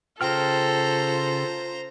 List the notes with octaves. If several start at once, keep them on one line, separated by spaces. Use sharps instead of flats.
C#3 F4 A4 C5 G5 A#5 F6